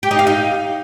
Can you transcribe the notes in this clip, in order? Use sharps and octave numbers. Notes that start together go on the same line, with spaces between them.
G4
D#4
F5
D#4